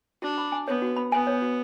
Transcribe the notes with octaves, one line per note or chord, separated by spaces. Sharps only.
D4 F#4
B5
G#5
B3 C#5
F#4
B5
B3 G#5
C#5
F#4